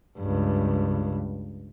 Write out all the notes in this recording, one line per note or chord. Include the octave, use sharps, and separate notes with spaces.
C#2 G2